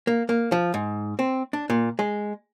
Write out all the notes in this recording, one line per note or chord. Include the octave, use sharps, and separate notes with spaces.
A#3
A#3
F3
G#2
C4
D4
A#2
G#3